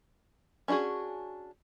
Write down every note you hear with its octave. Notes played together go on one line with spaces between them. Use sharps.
C#4 D4 F4 F#4 G#4